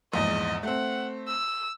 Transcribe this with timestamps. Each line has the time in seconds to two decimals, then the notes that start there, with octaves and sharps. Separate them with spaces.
0.14 A#1 E2 G#2 D#5
0.63 A3 C4 F#5
1.28 E6